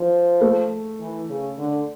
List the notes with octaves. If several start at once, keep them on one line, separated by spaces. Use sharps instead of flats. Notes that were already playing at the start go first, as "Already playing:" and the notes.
Already playing: F3
A3
E3
C#3
D3